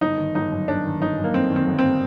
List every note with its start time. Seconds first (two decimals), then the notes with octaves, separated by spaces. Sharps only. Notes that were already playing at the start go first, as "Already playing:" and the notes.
0.01 G1 D#4
0.18 D#3
0.35 G1 D#4
0.52 F#2
0.68 G1 D4
0.85 D#3
1.01 G1 D#4
1.18 F#2
1.24 A#3
1.34 G1 C4
1.51 D#3
1.56 C4
1.67 G1
1.79 C4